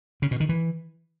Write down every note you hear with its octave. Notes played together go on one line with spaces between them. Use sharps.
C#3
B2
D#3
E3